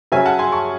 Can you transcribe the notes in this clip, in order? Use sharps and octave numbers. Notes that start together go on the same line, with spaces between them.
C#3 F#3 C#4 E5 G#5
F#5 A5
G#5 C6
A5 C#6